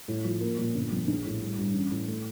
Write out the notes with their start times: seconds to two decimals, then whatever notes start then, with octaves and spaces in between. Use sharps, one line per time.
0.08 A2
0.25 F3
0.41 A#3
0.58 A#2
0.75 G1
0.92 F2
1.08 A#1
1.25 A2
1.41 G3
1.58 G2
1.74 A1
1.91 A2
2.08 A3